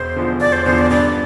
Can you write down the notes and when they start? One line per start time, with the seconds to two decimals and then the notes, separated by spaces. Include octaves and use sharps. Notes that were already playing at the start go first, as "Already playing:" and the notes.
Already playing: E1 C5
0.16 E2 D3 F3
0.40 E1 D5
0.53 C5
0.65 E2 D3 F3 C5
0.78 D5
0.90 G2 D5